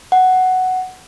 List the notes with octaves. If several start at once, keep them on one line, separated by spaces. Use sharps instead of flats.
F#5